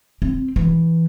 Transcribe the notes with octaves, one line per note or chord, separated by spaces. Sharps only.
C4
E3